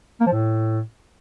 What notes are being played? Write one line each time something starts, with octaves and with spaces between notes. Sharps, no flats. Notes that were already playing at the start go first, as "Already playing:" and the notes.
A#3
F3
A2